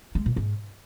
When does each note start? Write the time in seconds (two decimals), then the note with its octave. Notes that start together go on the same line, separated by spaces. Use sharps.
0.15 G#3
0.26 A#2
0.36 G#2